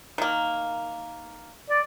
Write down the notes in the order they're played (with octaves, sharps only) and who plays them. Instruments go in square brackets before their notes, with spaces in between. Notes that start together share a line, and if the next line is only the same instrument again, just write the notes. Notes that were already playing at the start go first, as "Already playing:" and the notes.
[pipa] D#3 A#3
[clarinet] D5